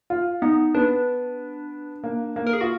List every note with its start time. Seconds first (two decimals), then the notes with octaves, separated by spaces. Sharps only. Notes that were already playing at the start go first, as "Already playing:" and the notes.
0.10 F4
0.42 B3 D#4
0.75 B3 D4
2.04 A#3
2.36 A#3
2.47 A#4
2.53 G#4
2.61 F4 F#4